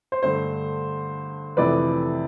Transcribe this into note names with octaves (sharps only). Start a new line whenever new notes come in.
C5
G2 D3 A3 C5
F2 C3 E3 A3 B4 D5